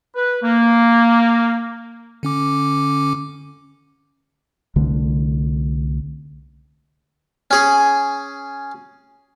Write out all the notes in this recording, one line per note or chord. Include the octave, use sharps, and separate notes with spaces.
B4
A#3
D3 C#4 D6
C2 D3 A3
C#4 G#4